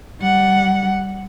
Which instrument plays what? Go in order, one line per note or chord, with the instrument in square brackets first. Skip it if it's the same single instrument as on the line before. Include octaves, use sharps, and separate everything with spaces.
[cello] G3 F#5